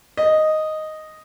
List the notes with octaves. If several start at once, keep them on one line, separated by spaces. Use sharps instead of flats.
D#5